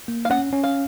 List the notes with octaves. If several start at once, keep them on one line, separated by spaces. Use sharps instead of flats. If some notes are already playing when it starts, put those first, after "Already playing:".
A#3
F5
C#4 F#5
C#4
F5